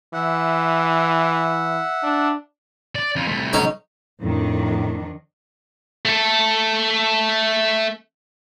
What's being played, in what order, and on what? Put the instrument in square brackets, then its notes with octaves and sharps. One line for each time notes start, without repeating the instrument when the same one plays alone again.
[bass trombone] E3 [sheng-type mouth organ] E5 F#5
[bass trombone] D4
[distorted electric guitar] D5
F2 F4
C2 A3
[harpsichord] B1 D#4 C#5
[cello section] F2 D#3 D4 [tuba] A2
[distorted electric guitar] A3 A4